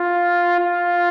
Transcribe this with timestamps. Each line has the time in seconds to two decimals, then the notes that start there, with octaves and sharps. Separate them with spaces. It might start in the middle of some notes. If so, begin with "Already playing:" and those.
Already playing: F4
0.60 F4